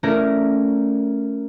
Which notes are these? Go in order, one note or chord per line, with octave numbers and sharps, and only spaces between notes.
A3 C#4 E4 A#4 D5 A#5